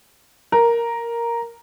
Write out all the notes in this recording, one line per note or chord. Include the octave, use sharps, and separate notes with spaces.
A#4